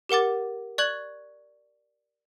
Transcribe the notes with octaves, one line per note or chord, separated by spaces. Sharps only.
G4 A#4 F#5 D6 A6
D5 C#6 F#6 G#6 F#7